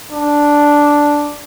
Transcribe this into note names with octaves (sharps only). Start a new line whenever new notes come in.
D4